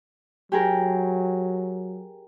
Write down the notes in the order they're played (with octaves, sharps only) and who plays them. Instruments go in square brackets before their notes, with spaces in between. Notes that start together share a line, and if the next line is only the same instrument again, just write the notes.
[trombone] F#3 [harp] G4 G#4 A#4